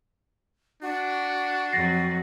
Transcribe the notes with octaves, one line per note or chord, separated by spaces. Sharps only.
D4 F#4
F2 F#3 A6 A#6 C7